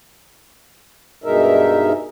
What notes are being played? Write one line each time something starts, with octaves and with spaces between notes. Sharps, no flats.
G2 B2 G#3 D#4 A#4 E5